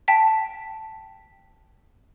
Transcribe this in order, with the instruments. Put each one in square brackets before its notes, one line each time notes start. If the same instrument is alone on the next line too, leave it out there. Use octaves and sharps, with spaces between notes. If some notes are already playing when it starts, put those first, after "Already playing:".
[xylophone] G5 A5 B6